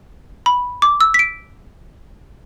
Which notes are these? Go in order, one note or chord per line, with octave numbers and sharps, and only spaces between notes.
B5
D6
E6
B6
D7